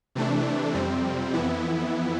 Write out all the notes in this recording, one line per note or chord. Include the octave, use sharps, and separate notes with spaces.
C3 E3 A3 D4
F2 C3 G3 C4
F2 E3 B3 E4